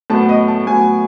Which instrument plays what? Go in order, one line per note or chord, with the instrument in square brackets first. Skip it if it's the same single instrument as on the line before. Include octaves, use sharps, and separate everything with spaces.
[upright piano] A2 F#3 B3 A5
D#5
A5
A2 F#3 B3 G#5